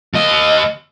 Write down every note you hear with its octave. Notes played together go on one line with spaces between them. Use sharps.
D#2 D#5